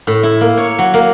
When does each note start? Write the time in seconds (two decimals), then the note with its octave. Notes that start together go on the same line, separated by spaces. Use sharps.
0.07 A2
0.23 E4
0.41 A#3
0.57 C#5
0.78 F#3
0.94 A#3